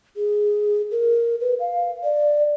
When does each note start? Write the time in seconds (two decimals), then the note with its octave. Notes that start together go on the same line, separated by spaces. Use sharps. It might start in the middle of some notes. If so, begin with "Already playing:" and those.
0.16 G#4
0.91 A#4
1.41 B4
1.60 F5
2.04 D5